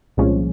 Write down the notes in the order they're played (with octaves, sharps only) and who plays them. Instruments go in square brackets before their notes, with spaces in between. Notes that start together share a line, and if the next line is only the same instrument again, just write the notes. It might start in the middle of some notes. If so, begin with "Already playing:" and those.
[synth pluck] C2 A#2 F3 G#3 C#4